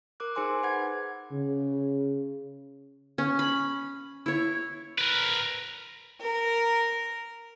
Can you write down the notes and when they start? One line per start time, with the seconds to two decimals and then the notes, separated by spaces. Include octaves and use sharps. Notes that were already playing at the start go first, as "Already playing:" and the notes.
0.20 A#4 D6 F#6
0.35 D#4 G#4 C5 G#5 C6 D6
0.63 B4 F#5 B5 G#6
1.32 C#3
3.18 C#4
3.39 B5
4.26 E4 C#5
4.98 A#4 B4
6.21 A#4